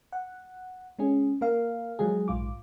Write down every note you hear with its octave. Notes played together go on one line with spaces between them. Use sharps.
F#5
G#3 C#4 G#4
A#3 A#4 F5
F3 F#3 G#3 G#4
A#1 G#2 F4 D6